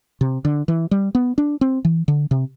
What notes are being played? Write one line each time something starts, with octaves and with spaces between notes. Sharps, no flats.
C3
D3
E3
G3
B3
D4
C4
E3
D3
C3